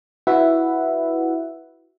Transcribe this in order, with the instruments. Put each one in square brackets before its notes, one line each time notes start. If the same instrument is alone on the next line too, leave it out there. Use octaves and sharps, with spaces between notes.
[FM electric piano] E4 F#4 B4 E5 F#5